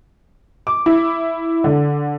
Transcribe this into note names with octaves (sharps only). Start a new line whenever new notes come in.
D6
E4
D3